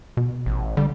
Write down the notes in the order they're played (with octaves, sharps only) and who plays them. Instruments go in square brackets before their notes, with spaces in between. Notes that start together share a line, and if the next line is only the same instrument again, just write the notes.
[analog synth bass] B2
[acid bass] A1
[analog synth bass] D3 [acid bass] G3